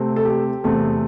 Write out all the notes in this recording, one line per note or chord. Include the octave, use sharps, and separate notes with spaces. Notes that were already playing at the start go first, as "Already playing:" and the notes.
Already playing: C3 A3 C4
A4
G4
E2 C3 A3 C4